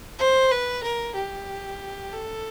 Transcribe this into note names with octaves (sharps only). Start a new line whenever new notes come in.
C5
B4
A#4
G4
A4